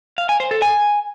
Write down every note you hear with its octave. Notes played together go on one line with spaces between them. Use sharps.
F5
G#5
C5
A4
G#5